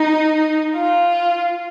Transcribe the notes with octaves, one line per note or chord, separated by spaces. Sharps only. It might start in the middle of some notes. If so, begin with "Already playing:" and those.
Already playing: D#4
F4